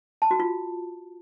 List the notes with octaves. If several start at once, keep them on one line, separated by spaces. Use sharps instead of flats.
A5
F#4
F4